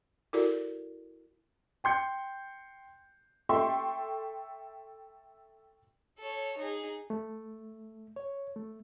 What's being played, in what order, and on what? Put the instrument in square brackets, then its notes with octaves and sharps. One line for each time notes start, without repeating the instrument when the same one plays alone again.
[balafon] E4 F#4 A4 A#4 D5
[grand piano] G5 C6 G6 C#7
[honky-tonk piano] A4 E5 G5 C6 C#6
[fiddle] A4 C#5
D#4 G#4
[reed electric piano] A3
C#5
A3